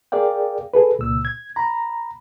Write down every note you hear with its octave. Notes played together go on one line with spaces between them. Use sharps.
G#4 A#4 D5 F5 G5
G#4 A4 B4
C#2 A#2 E6
G#6
A#5 B5